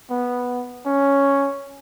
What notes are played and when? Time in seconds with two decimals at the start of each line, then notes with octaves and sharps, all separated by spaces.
0.10 B3
0.86 C#4